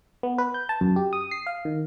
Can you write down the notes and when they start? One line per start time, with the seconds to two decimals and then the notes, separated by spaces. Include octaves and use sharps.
0.23 B3
0.38 B4
0.54 G6
0.69 A5
0.81 F#2
0.96 G4
1.13 D#6
1.31 C7
1.47 F5
1.65 D#3